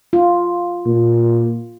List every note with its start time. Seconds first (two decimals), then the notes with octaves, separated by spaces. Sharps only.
0.13 F4
0.86 A#2